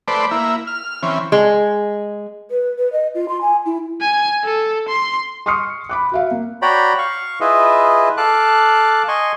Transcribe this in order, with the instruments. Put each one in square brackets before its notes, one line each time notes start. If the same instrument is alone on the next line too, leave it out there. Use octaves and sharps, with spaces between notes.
[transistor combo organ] A3 B4 C5 D5
A#3 E4
F6
E3 C4 C#4
[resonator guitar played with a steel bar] G#3
[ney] B4
B4
D#5
F4
C6
G#5
E4
[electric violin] G#5
A4
C6
[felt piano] C6 C#6 D#6 F6 C7 C#7
B5 D6 F#6
F#4 E5 F5
A#3
[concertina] F#4 C#5 D5 G5 A#5 B5
F5 C#6
E4 F4 G#4 B4 D#5 E5
A4 F5 A5 D6 F#6
D#5 G#5 C6 C#6